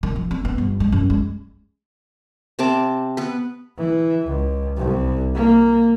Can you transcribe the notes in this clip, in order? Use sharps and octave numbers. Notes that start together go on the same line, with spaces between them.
D#3
F3
C4
B3
G1
G#3
F#2
G#3
C3 C4 A5 D6
B3 B4
E3
C#2
C2
A#3